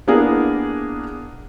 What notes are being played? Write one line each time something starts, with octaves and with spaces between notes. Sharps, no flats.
A#3 B3 D4 E4 G#4 A#4